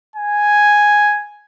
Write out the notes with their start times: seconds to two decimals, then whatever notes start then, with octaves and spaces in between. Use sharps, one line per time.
0.16 G#5